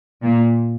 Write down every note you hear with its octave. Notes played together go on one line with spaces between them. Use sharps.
A#2